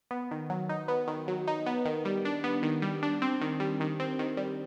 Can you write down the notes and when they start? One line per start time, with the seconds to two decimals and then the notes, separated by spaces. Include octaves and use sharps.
0.11 B3
0.31 D#3
0.50 F#3
0.69 D#4
0.88 B3
1.08 D#3
1.28 F#3
1.47 D#4
1.66 B3
1.85 D#3
2.05 G3
2.25 D4
2.44 B3
2.63 D#3
2.82 G3
3.03 D4
3.22 C4
3.42 D#3
3.60 G3
3.80 D#3
4.00 C4
4.19 D#3
4.37 G3